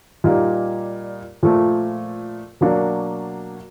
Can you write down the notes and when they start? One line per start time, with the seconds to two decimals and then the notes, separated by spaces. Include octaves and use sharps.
0.24 A#2 G3 A#3 D#4
1.43 A#2 F3 A3
2.61 B2 F#3 A#3 D4 F#4